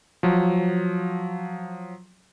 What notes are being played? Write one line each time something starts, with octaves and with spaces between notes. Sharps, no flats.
F3 F#3